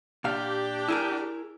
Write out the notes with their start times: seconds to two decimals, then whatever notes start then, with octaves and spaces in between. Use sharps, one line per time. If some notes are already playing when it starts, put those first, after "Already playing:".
0.24 A#2 D4 G4 F5
0.88 E4 G#4 A#4